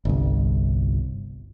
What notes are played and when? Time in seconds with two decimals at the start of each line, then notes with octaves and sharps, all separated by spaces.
0.05 G1 C2